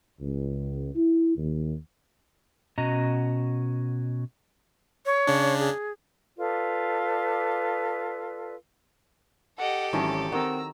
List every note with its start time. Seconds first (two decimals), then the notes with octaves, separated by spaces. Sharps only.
0.20 C#2
0.95 E4
1.37 D#2
2.78 B2 C#4 F#4 D#5 A#5
5.06 C#5
5.27 C#3 D4
5.59 G#4
6.37 F4 A4 B4 D5
9.58 G4 A4 D#5 F#5
9.93 G#1 D#3 E3 F#3 C#4 A5
10.32 D#3 C4 A#4 F#5 A#5 E6